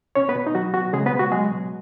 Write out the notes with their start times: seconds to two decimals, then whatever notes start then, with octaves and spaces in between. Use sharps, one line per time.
0.15 B2 C#4 C#5
0.29 B3 B4
0.35 B2
0.47 D#4
0.55 F#3 F#4
0.74 B2 F#4
0.93 C#3 G#3 G#4
1.06 B3 B4
1.13 G#3
1.19 F#4
1.31 F#3 G#3 G#4
1.51 B2